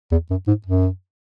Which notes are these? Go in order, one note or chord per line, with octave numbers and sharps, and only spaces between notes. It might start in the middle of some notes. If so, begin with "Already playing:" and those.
E2
F#2
G#2
F#2